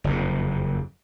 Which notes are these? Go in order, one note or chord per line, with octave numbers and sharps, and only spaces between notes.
F#1 F2 C3